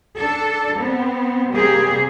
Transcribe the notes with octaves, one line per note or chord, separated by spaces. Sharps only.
D4 A4
B3 C4
C3 G3 A#3 G4 G#4